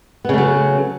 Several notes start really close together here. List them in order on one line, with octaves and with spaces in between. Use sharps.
B3 C#3 A3 F#3